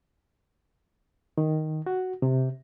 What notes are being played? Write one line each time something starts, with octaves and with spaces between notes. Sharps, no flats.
D#3
F#4
C3